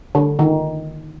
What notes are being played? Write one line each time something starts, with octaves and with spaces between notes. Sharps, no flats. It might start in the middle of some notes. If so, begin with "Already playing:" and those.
D3
D#3